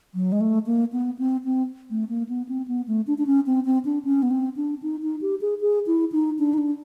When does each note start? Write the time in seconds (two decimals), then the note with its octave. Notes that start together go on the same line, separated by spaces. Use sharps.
0.15 F#3
0.32 G#3
0.41 A3
0.66 A#3
0.93 B3
1.19 C4
1.45 C4
1.91 A3
2.09 A#3
2.29 B3
2.49 C4
2.68 B3
2.88 A3
3.07 D4
3.18 D4
3.27 C#4
3.46 C4
3.65 C4
3.85 D4
4.05 C#4
4.22 B3
4.31 C4
4.56 D4
4.83 D#4
5.02 D#4
5.21 G4
5.41 G#4
5.61 G#4
5.87 E4
6.12 D#4
6.39 D4
6.54 D#4
6.58 D4